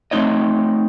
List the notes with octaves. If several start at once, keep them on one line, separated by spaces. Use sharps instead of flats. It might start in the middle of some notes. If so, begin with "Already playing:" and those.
A3 C4 D#4 C#5 D#5